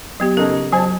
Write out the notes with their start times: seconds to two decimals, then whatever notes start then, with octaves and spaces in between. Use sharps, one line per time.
0.20 F#3 B3 G4
0.37 C#3 D#4 A4 A#4
0.73 F#3 C5 G#5 A5